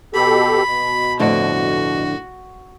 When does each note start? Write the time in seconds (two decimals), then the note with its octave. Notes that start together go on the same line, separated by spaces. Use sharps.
0.14 B2 G4 A4 B5
0.67 B2
1.20 F2 A2 D3 F#4